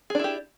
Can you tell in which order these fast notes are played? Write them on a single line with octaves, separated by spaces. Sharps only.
G#4 D4 E4 G4